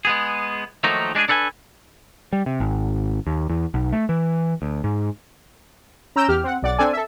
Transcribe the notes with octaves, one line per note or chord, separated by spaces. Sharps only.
G#3 B3 G#4
D#3 F3 F#3 A3 A#3 D#4
G#3 D4 E4 G#4
D4 A4 B4 F#5 G#5
G3
C3
G#1
D#2
E2
B1
A3
E3
D2
G#2
C#4 A#5 E6 G6 D7 E7
E2 G4 F6
C4 F#5
B1 D5 F#5 A6
C4 D4 A4 D5 G#5
A4 E5